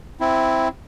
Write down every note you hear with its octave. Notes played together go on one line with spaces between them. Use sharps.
C4 E4